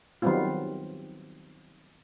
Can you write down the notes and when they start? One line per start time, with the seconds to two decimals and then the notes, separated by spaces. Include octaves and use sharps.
0.22 D#3 F#3 G3 B3 C4 F4